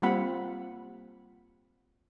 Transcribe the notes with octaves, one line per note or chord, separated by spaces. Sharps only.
G3 A#3 C4 F4 F#5 B5